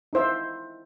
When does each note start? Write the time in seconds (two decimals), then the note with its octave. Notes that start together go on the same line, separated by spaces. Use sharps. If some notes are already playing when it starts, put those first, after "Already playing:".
0.13 D#4 E4 C5 E5 E6